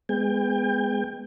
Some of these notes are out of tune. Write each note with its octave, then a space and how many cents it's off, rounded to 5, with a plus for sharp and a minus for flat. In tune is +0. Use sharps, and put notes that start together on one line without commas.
G#3 -5 B3 +15 G5 +35